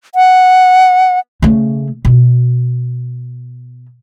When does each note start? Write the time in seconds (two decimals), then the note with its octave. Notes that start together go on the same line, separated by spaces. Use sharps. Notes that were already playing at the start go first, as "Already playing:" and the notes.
0.15 F#5
1.42 C#3 A3
2.05 B2